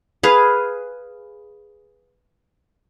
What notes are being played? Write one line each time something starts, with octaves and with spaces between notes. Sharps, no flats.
G#4 B4 F5